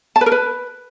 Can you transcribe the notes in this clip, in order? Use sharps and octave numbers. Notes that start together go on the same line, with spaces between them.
A5
B4
A#4
B4